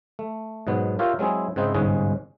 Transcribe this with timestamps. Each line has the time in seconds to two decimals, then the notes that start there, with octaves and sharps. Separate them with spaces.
0.19 A3
0.67 G#2 B2 F#3 B3
0.99 F4 G4 A#4 C#5 E5 F5
1.19 F#3 G#3 C4 E4 G#4
1.56 G#2 C#3 C4 D#4 E4
1.74 G1 C2 G#2 G#3 C#4 G#4